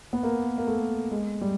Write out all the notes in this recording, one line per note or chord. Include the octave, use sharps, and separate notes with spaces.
B3
A#3
A#3
A3
G#3
G3